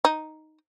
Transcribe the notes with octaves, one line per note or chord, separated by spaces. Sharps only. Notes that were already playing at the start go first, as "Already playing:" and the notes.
D#4